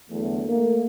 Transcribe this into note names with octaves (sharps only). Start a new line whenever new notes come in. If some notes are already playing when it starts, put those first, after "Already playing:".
E2 D3 F#3 A3
A3 A#3